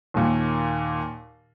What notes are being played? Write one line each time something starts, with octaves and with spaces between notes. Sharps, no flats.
D#2 A#2